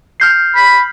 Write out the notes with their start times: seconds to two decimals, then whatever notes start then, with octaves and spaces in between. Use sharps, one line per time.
0.20 F6 G6 C7
0.56 B5